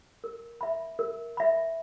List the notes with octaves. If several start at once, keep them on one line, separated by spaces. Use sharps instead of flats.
A#4
E5 B5
A#4
E5 B5